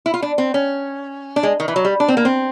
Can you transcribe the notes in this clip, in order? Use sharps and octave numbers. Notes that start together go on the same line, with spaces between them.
E4
F4
D4
C4
C#4
D4
G#3
D#3
E3
F#3
G3
D4
C4
A#3
C4